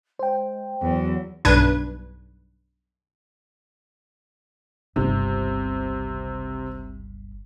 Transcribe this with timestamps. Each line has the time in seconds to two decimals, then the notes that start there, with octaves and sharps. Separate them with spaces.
0.19 G#3 C5 G5
0.82 E2 F#3
1.45 B1 G2 D4 B4 G#6
4.96 G1 C#2 C3